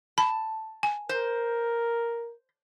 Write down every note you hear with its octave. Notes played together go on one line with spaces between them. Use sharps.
A5 B5
G#5
A#4 C5